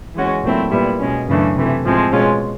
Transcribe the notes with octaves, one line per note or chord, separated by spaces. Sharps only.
E3 G#3 C#4 F#4
A#2 F#3 A3 C4 E4
A#2 G3 B3 E4
B2 G#3 C#4
F#2 C#3 E3 A3 D4
C3 E3 A3
A2 F3 G#3 C4
B2 G#3 C#4 F4